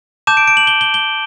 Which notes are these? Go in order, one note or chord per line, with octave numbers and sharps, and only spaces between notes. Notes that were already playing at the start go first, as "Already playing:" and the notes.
A5 D6 G6 E7
D7
D7
F#7
G7
G7
G7